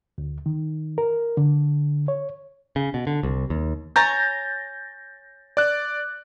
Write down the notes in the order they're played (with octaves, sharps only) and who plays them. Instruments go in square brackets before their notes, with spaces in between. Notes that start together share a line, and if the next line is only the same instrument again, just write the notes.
[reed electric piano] D2
D#3
A#4
D3
C#5
[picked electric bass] C#3
B2
D3
C2
D#2
[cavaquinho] C#5 G#5 A#5 [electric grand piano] G6 A6 A#6
[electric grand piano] D5 F#6